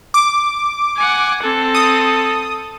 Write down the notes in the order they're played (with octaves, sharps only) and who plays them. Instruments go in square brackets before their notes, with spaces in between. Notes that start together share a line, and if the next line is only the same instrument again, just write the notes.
[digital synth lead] D6
[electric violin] F#5 G#5
C4 A4
[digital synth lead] D#6